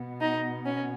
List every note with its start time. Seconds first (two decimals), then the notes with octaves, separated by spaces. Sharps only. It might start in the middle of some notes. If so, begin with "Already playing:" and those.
Already playing: B2 B3
0.20 D#4
0.65 C#4